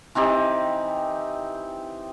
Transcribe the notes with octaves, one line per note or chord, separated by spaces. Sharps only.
E3 C4 D#4 G4